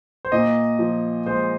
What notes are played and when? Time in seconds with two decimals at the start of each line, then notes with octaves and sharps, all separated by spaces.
0.25 C5
0.32 A#2 D#5
0.79 F3
1.26 G#3 C5